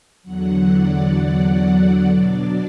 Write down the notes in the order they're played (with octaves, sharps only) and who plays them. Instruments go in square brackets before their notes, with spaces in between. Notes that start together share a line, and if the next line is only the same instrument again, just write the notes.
[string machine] E2 D3 F#3 F#5
D5
D5
B2 F#3 D4 D5